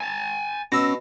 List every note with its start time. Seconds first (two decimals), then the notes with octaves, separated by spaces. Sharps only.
0.01 G#5 A5
0.72 B2 C#4 E6 A#6